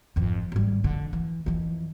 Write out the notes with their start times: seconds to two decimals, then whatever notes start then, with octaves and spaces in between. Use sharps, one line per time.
0.16 G#1 F2
0.52 G#1 G3
0.84 F2 D3
1.13 E3
1.46 F2 E3